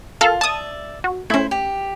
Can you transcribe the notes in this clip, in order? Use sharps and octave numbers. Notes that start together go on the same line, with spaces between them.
F4 A4 A#4 F5
D5 E5 A5 D#6
F#4
A3 C#4 E4 C5
G4